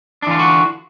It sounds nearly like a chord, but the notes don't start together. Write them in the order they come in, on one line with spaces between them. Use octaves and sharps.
D4 E3 F4 D3 F#4